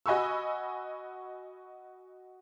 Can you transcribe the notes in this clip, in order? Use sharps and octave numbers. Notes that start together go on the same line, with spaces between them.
F#4 D#5 G#5 B5 C#6 E6